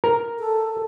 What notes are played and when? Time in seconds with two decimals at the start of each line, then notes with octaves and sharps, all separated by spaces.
0.04 A#4
0.39 A4